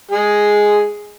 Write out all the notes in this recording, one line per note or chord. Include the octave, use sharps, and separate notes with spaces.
G#3 G#4